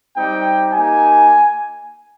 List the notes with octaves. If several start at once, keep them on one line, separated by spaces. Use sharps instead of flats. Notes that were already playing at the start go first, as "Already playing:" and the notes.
G3 C4 D#4 G4 G5
A#3 D#4 G4 G#5